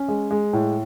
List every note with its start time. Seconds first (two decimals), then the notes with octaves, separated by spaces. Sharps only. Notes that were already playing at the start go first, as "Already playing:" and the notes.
Already playing: C#4
0.08 G#3
0.31 G#3
0.53 A2